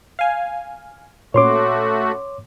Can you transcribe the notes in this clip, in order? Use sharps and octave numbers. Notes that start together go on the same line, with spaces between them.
F5 G#5
A#2 A3 C#4 F#4 C#5 C6 D6